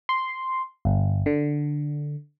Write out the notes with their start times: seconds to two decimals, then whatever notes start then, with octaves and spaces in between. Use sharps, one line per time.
0.09 C6
0.85 G1
1.26 D3